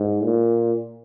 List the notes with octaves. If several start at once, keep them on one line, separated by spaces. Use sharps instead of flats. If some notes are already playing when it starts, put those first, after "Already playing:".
Already playing: G#2
A#2